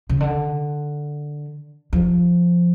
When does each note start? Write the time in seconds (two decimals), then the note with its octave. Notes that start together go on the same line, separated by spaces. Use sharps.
0.09 C#3
0.20 D3
1.93 F3